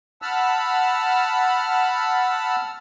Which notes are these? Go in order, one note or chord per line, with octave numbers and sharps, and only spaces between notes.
F#5 A5 B5 E6 F6